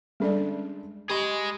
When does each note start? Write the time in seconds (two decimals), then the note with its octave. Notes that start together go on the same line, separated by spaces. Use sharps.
0.20 G3 G#3 C#4 D4 A4 D5
1.09 G4 G#4 D#5 B5 C#6